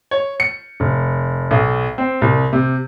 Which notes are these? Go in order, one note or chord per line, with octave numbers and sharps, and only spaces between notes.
C#5
C#7
F1
B1
C4
C2
C3